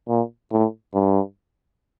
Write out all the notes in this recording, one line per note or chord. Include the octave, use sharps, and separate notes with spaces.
A#2
A2
G2